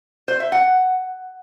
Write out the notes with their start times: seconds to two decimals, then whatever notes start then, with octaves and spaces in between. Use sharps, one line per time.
0.28 C5
0.40 E5
0.52 F#5